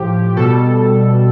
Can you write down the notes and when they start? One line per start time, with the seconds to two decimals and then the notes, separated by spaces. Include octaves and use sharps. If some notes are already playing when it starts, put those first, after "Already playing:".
Already playing: A2 F3 G4
0.36 B2 G3 A4